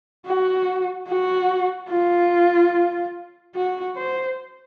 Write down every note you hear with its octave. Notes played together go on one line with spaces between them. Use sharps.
F#4
F#4
F4
F#4
C5